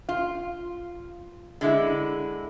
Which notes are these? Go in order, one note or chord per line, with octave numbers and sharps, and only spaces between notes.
F4
D3 G#3 E4